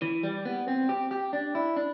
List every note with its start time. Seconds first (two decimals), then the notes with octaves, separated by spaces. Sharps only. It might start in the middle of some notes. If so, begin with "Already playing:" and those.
0.02 E3
0.23 G3
0.45 B3
0.68 C4
0.89 G4
1.11 G4
1.33 D4
1.55 E4
1.76 D4